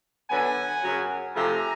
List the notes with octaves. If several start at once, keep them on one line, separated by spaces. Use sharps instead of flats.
D3 F#3 B3 F#5 G#5
F#2 C#3 F#3
C3 F3 A3 G#5 A#5